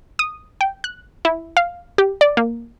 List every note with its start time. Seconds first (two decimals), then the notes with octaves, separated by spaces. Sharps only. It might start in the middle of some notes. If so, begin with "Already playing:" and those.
0.19 D#6
0.61 G5
0.84 F#6
1.25 E4
1.57 F5
1.98 G4
2.21 D5
2.37 A#3